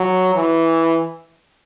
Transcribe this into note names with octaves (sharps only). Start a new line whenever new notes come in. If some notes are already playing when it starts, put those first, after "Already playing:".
Already playing: F#3
E3